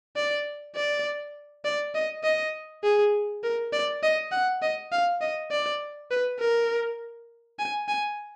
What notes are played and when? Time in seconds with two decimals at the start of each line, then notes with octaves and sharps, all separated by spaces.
0.16 D5
0.76 D5
1.65 D5
1.95 D#5
2.24 D#5
2.83 G#4
3.43 A#4
3.73 D5
4.03 D#5
4.32 F#5
4.62 D#5
4.92 F5
5.21 D#5
5.51 D5
6.11 B4
6.39 A#4
7.59 G#5
7.88 G#5